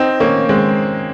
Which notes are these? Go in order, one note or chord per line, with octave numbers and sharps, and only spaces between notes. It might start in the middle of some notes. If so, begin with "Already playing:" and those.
Already playing: C4 D#4
A#3 C#4
G#3 C4